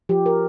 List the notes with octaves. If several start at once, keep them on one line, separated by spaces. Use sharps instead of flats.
F3 G4
A#4